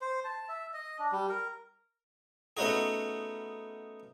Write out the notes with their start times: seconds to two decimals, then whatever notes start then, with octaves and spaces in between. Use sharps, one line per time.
0.01 C5
0.24 A5
0.49 E5
0.73 D#5
0.99 D4
1.12 G3
1.29 A#4
2.57 A3 B3 C#4 D#4 F#4 G#4